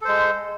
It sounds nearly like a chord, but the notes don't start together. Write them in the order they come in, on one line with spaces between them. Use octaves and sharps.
A4 C5 G#3